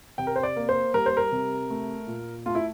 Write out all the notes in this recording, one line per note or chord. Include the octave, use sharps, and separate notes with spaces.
C3 G5
A#4
C5
D5
A#3
C5
G3 A#4
C5
A#4
C3
A3
A#2
A3 F4
E4